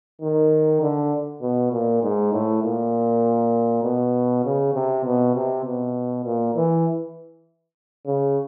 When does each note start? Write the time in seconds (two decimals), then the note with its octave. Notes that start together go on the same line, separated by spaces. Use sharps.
0.21 D#3
0.82 D3
1.42 B2
1.72 A#2
2.03 G#2
2.33 A2
2.63 A#2
3.84 B2
4.44 C#3
4.74 C3
5.05 B2
5.35 C3
5.64 B2
6.25 A#2
6.55 E3
8.06 C#3